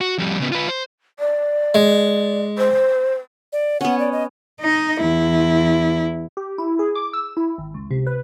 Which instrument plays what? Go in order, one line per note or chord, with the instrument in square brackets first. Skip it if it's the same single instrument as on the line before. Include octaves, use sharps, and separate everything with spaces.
[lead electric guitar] F#4
F2 G3
C#3 B3
F4 B4
C5
[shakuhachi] D5
[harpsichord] G#3
[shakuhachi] C5
[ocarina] D5
[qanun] B3 C#4 [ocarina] F#5
[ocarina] D5
D#5
[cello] D#4 D#5
E2 E4
[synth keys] G4
E4
G#4
D6
E6
E4
G#1
C#2
C3
B4